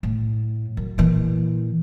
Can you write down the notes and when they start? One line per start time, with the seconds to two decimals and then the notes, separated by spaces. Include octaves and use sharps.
0.03 A2
0.77 F#2
0.98 A#2 E3